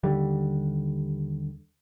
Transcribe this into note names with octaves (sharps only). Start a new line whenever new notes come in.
D#2 D3 G3